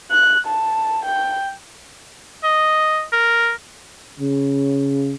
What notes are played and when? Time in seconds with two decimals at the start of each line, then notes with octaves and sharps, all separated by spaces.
0.11 F#6
0.47 A5
1.06 G5
2.44 D#5
3.13 A#4
4.20 C#3